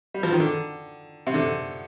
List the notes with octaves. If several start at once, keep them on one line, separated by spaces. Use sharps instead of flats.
G3
F3
D#3
D3
C3
D3